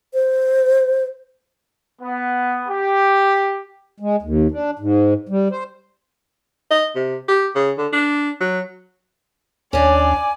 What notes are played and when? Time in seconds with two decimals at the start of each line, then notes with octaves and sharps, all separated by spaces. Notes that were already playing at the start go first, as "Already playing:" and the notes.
0.14 C5
2.02 B3
2.68 G4
4.00 G#3
4.22 D#2
4.51 D4
4.79 G#2
5.29 G3
5.51 C5
6.71 D#5
6.96 C3
7.28 G4
7.55 C#3
7.78 D3
7.93 D4
8.41 F#3
9.73 D#2 C#4 D4 D5 G#5